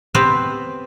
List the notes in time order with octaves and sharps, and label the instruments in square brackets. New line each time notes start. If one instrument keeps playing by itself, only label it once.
[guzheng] B3 C4 G4 B4 C5